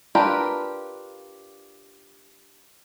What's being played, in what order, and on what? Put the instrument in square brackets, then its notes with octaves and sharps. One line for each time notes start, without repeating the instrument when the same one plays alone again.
[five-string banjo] D4 F4 G4 A#4 B4